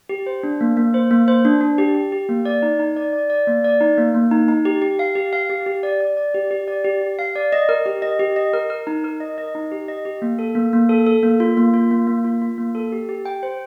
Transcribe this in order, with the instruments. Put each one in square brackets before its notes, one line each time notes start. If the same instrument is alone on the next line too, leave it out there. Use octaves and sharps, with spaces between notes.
[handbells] G4
C5
D4
A#3
A#3
C5
A#3
C5
D4
D4
G4
G4
G4
A#3
D5
D#4
D#4
D5
D5
D5
A#3
D5
D#4
A#3
A#3
D#4
D#4
G4
G4
F5
G4
F5
G4
G4
D5
D5
D5
G4
G4
D5
G4
G4
F5
D5
D#5
A#4
G4
D#5
G4
D#5
A#4
A#4
D#4
A#4
D#5
D#5
D#4
G4
D#5
G4
A#3
A4
A#3
A#3
A4
A4
A#3
F4
A#3
F4
A#3
A#3
F4
F4
A#3
A4
G4
G4
G5
C5